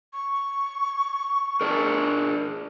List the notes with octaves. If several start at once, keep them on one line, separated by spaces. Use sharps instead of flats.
C#6
D4 G#4 A#4